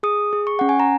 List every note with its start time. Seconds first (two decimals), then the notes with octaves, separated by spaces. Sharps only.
0.03 G#4 D#6
0.33 G#4
0.47 C#6
0.59 C#4 F#5
0.69 G#5
0.80 A#5